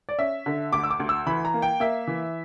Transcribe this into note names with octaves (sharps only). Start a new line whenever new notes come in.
D5
C#4 E5
D3
D2 D6
E6
D6
D2
E6
E3 B5
A#5
A#3
G5
A#3 E5
E3